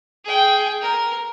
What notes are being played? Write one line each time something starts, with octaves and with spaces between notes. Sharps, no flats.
G#4 G5
A#4